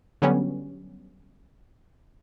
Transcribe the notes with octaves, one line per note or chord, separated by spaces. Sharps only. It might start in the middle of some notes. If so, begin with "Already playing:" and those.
D3 F#3 G3 B3 C#4